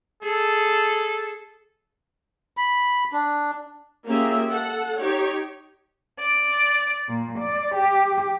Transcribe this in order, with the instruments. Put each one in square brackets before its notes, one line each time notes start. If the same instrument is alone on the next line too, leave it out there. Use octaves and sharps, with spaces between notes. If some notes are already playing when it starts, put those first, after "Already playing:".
[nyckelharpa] G#4 [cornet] A4
[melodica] B5
D4
[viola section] A#3 C#4 F4 G4 G#4 E5
A4 F#5
D#4 G4 C#5
[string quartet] D5
A#2
D5
G4